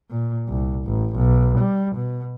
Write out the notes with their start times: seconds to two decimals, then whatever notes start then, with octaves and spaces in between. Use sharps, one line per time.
0.11 A#2
0.49 C2
0.86 A1
1.16 B1
1.59 G3
1.96 B2